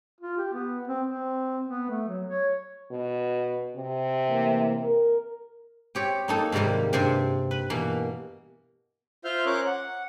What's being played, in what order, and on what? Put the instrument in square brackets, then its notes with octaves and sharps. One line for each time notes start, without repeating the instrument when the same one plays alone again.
[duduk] F4
G4
B3
C4
C4
B3
A3
F#3
C#5
[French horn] B2
C3
[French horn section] A2 E3 A#3
A#4
[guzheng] C4 G4 C#5
A#3 D#4 A4
G#2 C3 D#3 G3 A#3
G2 C3 C4
B4
B2 E3 A#3
[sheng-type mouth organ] F4 C5 E5 F5 F6 G6
C#4 A#4 C5 C#5 D6 F#6
F#5